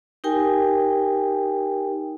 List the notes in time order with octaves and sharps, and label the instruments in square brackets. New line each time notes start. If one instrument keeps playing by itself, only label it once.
[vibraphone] D#4 G4 A#4 G5 G#5